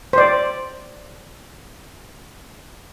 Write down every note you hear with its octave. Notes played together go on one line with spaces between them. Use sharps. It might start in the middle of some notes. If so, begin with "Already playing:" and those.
C5 D5